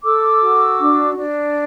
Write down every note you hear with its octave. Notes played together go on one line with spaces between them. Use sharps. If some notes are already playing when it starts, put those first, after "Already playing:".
A4 D6 E6
F#4
D4
D4